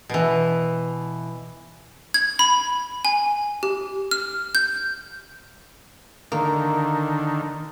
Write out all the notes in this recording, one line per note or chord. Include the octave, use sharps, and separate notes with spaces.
B2 E3
G#6
B5
G#5
G4
F6
G6
D3 D#3 A#3